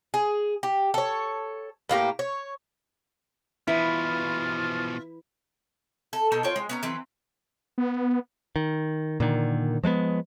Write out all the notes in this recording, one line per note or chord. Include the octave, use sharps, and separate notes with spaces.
G#4
G4
A4 C#5
A2 A#3 F4 G4
C#5
B2 E3 F3 E4 F4
A4
B2 D#4 A4 A5
F4 C5 C#5 G5
G#3
B3 C#4 A#5
E3 F#3 C4 B4
B3
D#3
A#2 D3 D#3
F3 G#3 A3 B3